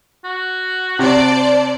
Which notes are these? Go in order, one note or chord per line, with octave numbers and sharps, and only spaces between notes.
F#4
C3 C5 D5 A5